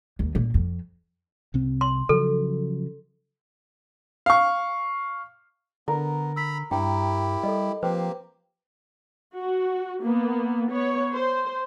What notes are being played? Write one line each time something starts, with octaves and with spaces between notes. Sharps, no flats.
D#2
A#2
F2
C2 C3 C4
C6
C#3 F3 F#3 A4
F5 C#6
D3 B3 A#4
A#5 B5 E6 B6
G2 E4 G4 G5 A#5
G3 A4 D#5
F3 A#3 C4 G4 B4 C5 G5
F#4
A#3 B3
B3 C#5
C5